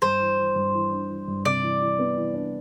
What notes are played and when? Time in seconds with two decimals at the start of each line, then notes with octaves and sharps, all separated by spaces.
0.02 G2 C5
0.20 E3
0.38 E3
0.56 G2
0.73 E3
0.91 D4
1.09 E3
1.28 G2
1.45 C3 D5
1.62 E3
1.81 E3
1.99 B3
2.16 E3
2.34 D4